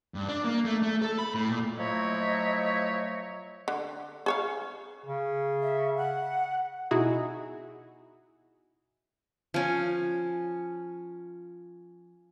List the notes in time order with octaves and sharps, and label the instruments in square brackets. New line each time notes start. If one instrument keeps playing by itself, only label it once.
[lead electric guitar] G2
D4
A#3
A3
A3
A4
B5
A2
A#2
[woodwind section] F3 F#3 A3 E4 C#5 D#5
[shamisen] D3
G#4 C#5 F5
[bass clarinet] C#3
[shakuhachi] E5
F#5
[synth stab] B2 D#4 E4 F#4 G#4
[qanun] F3 C#4